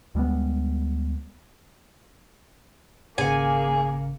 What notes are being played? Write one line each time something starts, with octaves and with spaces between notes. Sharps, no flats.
D2 G3 G#3 B3
G#1 C#3 A#3 G#4 G#5 C#7